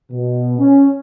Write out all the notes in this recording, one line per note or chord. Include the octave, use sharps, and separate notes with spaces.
B2
C#4